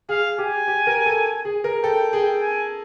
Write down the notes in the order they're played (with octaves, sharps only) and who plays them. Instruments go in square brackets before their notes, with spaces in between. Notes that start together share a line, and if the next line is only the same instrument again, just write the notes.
[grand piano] G#4 [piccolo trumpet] F5
[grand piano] G4 [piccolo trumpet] G#5
[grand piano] G4
A#4
A4
G#4
A#4
[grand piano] A4 [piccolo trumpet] G5
[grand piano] G#4 [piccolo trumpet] G5
[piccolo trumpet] G#5